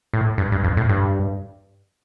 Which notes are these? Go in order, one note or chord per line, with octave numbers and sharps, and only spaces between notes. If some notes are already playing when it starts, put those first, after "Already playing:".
A2
G2
G2
F2
A2
G2